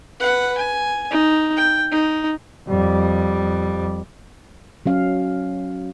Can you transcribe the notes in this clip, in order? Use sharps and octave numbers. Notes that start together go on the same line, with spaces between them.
B4 F#5
G#5
D#4
G5
D#4
F2 G3
F#3 C#4 F5